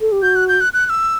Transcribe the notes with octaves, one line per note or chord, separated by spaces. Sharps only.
A4
G4
F#4 G6
F#6
G6
F#6
F#6
F#6
E6